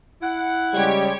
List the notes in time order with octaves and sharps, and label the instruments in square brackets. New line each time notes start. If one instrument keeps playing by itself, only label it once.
[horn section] E4 F#5
[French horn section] C#3 G3 G#3 [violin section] G4 C#5 G#6